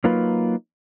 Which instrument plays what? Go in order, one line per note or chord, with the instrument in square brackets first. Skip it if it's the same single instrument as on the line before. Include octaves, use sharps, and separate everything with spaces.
[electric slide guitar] F#3 A#3 D#4 F4 B4